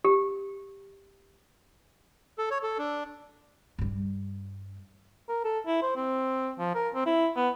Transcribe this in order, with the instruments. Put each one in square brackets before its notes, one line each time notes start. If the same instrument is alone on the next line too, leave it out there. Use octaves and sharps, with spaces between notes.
[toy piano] G4
[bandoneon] A4
C#5
A4
D4
[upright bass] G2 G3
[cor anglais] A#4
A4
E4
C5
C4
F3
A#4
C4
E4
B3